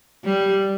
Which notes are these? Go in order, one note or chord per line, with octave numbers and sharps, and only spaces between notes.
G3